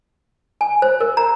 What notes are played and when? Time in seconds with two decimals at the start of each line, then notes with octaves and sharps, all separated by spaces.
0.61 G#5
0.82 C5
1.00 A#4
1.17 A#5